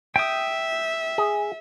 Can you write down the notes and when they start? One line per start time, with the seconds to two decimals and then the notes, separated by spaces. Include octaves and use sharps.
0.16 E5 G5 D#6
1.18 G#4